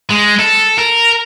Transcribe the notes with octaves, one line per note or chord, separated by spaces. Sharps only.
G#3
A4
A#4